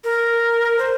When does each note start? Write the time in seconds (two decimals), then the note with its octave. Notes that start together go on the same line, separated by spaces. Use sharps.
0.04 A#4
0.79 C5